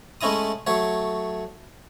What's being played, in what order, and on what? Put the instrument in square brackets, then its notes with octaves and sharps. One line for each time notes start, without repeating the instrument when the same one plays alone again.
[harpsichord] G#3 A3 C#4 E4 A#5 D#6
F#3 A3 C#5